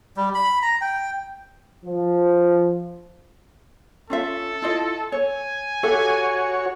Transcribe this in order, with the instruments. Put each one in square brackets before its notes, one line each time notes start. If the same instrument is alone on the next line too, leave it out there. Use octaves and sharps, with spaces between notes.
[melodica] G3
B5
A#5
G5
[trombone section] F3
[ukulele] C#4 F4 E5 [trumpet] A4
[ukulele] E4 F4 D#5
[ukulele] C#5 [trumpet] G#5
[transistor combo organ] F#4 C#5 [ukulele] G4 A4 E5